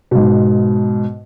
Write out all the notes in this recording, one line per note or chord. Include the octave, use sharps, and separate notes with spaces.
G#2 B2